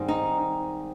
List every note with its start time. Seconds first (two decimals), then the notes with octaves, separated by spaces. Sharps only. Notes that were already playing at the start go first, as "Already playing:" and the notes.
Already playing: G#2 D#3 G3 C4
0.08 D#4